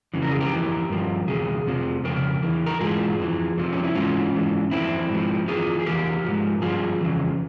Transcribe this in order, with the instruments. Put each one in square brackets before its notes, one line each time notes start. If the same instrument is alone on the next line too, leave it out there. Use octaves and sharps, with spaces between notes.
[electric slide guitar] F2 C#3 E3
A#4
G#4
G4 A#4
F2 E3
G2 F3
E2 C3 G#4
F2 C3 F3
F2 C#3 A#4
E2 E3
A#4
G#2 E3 F4 G#4
F2 E3
F2 C3 F3
C#4
E4
G#2 E3 C#4 F4
G#2 E3
F2 E3 C4 E4
G#2
F3
F2 E3 F4 G#4
G#4
E2 E3 G4 A#4
G#2 F3
G2 F3 F4 G#4
F2 C#3 E3